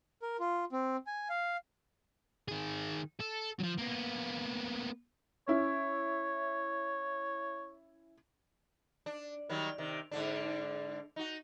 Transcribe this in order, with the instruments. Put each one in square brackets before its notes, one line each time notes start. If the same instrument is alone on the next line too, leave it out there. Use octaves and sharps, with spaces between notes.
[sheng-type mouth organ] A#4
F4
C4
G#5
F5
[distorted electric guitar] D#3 G#4
A4
F3 F#3
A#3 B3
[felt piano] C#4 E4 [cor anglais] C#5
[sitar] D4
D#3 F#3 G3
C3 D#3
G#2 D3 D4
D#4 F#4